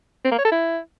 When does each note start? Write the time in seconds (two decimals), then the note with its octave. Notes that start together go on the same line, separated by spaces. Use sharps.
0.24 C4
0.31 A#3
0.38 C#5
0.45 A4
0.52 E4